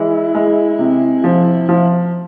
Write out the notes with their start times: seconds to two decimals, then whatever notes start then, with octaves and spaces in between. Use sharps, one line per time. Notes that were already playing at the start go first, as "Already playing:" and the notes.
Already playing: E3 G#3 E4
0.35 G#3
0.79 C3
1.24 F3
1.69 F3